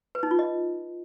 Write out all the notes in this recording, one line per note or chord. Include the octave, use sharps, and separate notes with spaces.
B4
D#4
F4
D#5